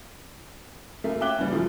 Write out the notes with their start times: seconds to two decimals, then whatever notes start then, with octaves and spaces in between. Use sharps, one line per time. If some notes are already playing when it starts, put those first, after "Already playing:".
1.04 F#2 A3 A#3
1.21 C#4 E5 G5 D6 F#6 G7
1.38 C#3 E3 G3
1.51 F#2 F3 A3